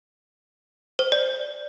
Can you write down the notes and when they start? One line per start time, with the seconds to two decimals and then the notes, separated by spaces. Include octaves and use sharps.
0.99 C5
1.12 D5